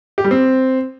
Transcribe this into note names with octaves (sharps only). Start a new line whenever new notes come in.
G4
G3
C4